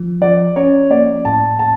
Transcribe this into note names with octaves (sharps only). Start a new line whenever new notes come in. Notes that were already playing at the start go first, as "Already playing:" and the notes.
Already playing: F3
F3 D5
C#4 C#5
A#3 D5
A2 A5
A2 A5